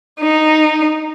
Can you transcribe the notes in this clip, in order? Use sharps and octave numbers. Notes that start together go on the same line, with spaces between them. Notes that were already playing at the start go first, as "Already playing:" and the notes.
D#4